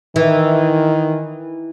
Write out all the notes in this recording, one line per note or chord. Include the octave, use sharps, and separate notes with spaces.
D#3 E3